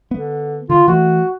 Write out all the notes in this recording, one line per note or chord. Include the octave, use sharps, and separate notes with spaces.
D3 B3
D3 F4
E3 A3 F#4